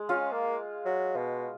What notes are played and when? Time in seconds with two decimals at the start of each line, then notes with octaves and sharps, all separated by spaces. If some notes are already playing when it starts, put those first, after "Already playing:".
Already playing: G#3
0.09 C#4 F4 F5
0.32 A#3
0.85 F#3
1.16 B2